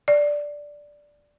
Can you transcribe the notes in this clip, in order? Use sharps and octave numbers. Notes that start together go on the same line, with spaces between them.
D5